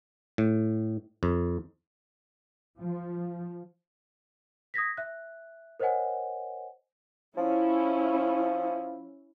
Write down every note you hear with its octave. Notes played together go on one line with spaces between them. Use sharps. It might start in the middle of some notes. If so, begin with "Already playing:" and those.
A2
F2
F3
D#6 G#6 A#6 B6
E5 F#6
A#4 C5 C#5 D#5 F#5 G#5
F3 C#4 E4